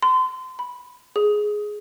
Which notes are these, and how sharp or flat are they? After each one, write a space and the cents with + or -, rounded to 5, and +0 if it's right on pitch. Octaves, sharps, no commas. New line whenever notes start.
C6 -30
B5 -5
G#4 +5